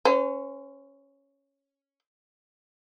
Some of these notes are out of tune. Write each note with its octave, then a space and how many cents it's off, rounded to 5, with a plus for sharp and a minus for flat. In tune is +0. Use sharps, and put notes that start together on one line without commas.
C#4 +0 C5 -40